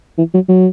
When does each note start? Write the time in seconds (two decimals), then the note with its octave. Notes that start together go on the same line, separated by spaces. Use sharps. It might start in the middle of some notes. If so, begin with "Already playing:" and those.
0.18 E3
0.34 F#3
0.49 F#3